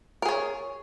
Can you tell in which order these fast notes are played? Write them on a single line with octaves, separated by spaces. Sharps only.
A#4 G#4 C#5